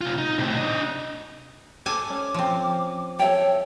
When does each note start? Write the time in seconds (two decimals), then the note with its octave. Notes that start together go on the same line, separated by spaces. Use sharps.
0.01 C3 F4
0.18 D#4
0.38 A2 C3
0.57 D4 D#5
1.86 A4 G#5 D6
2.10 C#4
2.34 F3 C4
3.19 A4 C#5 E5 G5